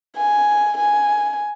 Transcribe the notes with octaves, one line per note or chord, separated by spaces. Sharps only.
G#5
G#5